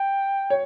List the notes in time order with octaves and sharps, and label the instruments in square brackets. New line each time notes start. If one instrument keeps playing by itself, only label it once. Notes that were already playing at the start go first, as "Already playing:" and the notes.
Already playing: [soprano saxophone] G5
[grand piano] C#5